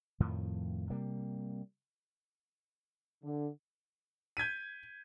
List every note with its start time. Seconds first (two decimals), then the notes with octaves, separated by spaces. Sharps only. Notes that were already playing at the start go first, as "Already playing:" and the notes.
0.20 F2 A2 D#3 F3
0.90 C3 G3 A#3
3.22 D3
4.37 G6 G#6 B6 D#7